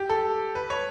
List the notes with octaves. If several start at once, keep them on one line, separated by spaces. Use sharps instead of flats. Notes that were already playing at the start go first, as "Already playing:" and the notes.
Already playing: G4
A4
B4
C#5